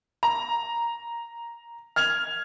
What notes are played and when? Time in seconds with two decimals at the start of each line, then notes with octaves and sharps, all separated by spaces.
0.23 A#5
1.96 F6 G#6 F7